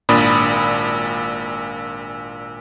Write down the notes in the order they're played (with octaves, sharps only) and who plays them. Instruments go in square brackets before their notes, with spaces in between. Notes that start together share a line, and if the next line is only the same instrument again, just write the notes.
[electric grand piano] G#1 A#2 D4 D5 B5 D#6